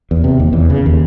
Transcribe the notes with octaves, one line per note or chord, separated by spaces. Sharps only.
E2
C3
D#2
E2
C#3
D#2